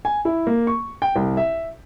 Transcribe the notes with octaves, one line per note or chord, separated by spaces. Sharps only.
G#5
E4
A#3
C#6
G5
C2
E5